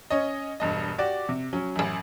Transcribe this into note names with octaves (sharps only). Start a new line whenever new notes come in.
C#4 C#5 D#5
E1 G2 D#5
F#4 G4 D5
C3
F#3 C#4
A1 F#2